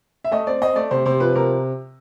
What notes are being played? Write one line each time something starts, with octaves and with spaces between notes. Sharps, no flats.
E5
A3 D#5
C4 D5
C4 D#5
A3 D5
C3 C5
C3 C5
F3 B4
C3 A#4